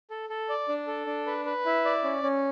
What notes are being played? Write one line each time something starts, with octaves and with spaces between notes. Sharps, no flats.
A4
A4
D5
D4
A4
D4
B4
B4
E4
D5
C#4
C#4